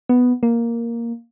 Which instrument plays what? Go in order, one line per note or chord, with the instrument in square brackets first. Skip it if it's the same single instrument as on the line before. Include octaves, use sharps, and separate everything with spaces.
[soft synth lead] B3
A#3